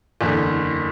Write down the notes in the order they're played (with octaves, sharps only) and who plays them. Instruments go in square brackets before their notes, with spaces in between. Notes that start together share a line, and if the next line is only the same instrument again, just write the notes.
[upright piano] F#1 E2 D3